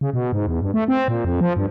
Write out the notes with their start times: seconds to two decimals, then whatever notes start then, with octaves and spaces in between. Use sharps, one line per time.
0.01 C#3
0.14 B2
0.33 G#2
0.47 E2
0.62 G2
0.74 A3
0.88 C4
1.08 A#2
1.25 F2
1.41 F3
1.57 G2